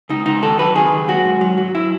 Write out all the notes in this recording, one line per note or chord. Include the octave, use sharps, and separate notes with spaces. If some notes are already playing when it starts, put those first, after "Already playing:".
C#2 D#4
C#2 D#4
D#3 A4
F#3 B4
D#3 G#4
D#2
F#3 F#4
G#2
F#3
F#3
E4